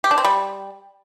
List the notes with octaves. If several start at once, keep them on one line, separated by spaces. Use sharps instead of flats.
G4
D4
C4
G3